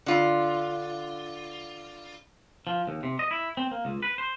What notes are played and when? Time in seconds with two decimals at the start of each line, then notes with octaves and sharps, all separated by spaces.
0.06 D3 F4
2.67 F3
2.88 D#2
3.03 C3
3.19 D#5
3.31 E4
3.57 C4
3.71 A#3
3.85 C#2
4.02 B4
4.18 C5